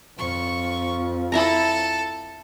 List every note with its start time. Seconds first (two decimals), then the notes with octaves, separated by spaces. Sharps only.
0.18 F2 F3 C#6
1.32 E4 A4 E5 A5 A#5